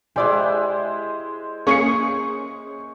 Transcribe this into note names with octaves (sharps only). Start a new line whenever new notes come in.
G#3 E4 G4 C5 D5 G5 G#5
A#3 C#4 G#4 C#6 C#7